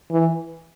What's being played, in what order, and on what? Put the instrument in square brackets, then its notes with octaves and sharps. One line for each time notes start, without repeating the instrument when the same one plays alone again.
[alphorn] E3